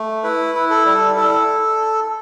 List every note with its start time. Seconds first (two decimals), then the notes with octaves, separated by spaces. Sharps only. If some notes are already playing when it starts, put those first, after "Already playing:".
Already playing: A3
0.24 E4 B4
0.55 E4
0.70 A4
0.85 G3
1.16 E4 A4